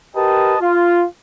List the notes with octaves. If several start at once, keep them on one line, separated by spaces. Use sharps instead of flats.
G4 A#4 B4 D#5 G5 A5
F4